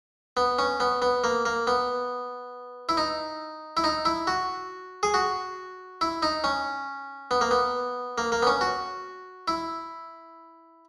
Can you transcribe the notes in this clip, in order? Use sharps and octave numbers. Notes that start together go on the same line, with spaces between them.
B3
C#4
B3
B3
A#3
A#3
B3
E4
D#4
E4
D#4
E4
F#4
G#4
F#4
E4
D#4
C#4
B3
A#3
B3
A#3
A#3
B3
C#4
F#4
E4